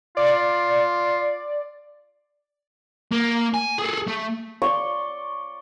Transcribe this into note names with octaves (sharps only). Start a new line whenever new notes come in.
F4 D5
A#3
G#5
G#4 A4
A3
D5 C6 C#6